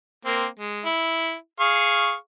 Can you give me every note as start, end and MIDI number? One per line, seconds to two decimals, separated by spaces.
0.25 0.46 58
0.25 0.46 60
0.59 0.83 56
0.85 1.34 64
1.60 2.14 68
1.60 2.14 77
1.60 2.14 85